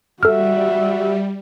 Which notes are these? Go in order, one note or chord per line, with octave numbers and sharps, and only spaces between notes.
G3 F#4 A4 E5 F6